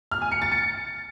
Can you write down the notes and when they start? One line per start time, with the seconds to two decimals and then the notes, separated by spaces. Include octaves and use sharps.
0.11 F6
0.22 G#5
0.32 C#7
0.42 A6
0.52 C#7